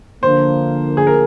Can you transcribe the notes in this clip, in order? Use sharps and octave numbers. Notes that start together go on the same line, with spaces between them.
D3 F3 A#3 C5
G#4
A#4